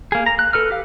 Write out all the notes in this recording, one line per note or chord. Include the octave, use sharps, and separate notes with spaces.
A#3 G#4
A#5
F#6
A4 B4 F6
G4 F5